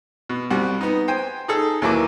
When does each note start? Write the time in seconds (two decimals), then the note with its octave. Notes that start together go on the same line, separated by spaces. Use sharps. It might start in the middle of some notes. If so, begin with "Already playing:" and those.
0.29 B2
0.50 C2 G3 F#4
0.81 B3 D#4
1.08 C5 G5 G#5
1.48 D#4 G#4 A4
1.82 D#2 E3 F#3 A#3 D6